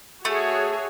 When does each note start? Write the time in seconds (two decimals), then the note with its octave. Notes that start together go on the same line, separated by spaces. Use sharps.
0.25 A3 F#4 G#4 C#5